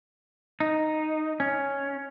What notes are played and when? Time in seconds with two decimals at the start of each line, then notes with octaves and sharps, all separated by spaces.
0.60 D#4
1.40 C#4